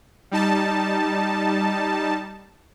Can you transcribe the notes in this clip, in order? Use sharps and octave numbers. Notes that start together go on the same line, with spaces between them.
G3 D#4 A5